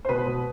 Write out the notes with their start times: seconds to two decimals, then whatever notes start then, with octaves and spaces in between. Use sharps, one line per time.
0.05 C5
0.09 B2 B4
0.27 B2